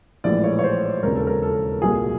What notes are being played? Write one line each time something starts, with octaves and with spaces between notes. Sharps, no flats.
A#1 A2 E3 G#3 D5
C#5
C#5
C5
E1 D#2 C#3 A#4
A4
A#4
A4
C2 A#2 F#3 G#4